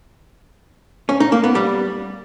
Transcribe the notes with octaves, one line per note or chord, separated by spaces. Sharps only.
C#4
D#4
A#3
B3
G3